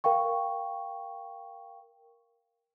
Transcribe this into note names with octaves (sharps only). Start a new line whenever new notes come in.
A#4 F5 G5 C#6